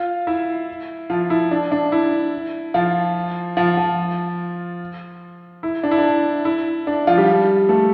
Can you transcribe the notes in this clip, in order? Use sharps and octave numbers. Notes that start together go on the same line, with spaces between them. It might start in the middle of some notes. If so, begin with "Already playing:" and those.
Already playing: F4 F5
E4 E5
F3 F4
E4
D4
D4
E4
F3 F4
F3 F4
F3 F4
E4
D4
E4
D4
E4
D4
F3 F4
G3 G4
A3 A4